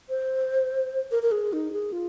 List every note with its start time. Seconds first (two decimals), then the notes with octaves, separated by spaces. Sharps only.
0.09 C5
1.11 A#4
1.23 A#4
1.31 G#4
1.53 D#4
1.73 G#4
1.93 F4